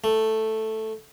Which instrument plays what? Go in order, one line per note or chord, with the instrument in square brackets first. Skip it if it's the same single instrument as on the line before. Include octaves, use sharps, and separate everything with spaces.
[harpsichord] A3